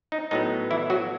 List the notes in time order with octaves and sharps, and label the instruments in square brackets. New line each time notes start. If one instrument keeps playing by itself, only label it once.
[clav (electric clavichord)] D#4
A2 F#3 B3 D#4
E3 E4
F#3 F#4